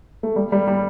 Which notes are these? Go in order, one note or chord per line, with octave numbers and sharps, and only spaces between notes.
A3
G3
G3
G3